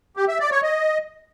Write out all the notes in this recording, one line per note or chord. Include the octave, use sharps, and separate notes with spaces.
G4
E5
D5
C#5
D#5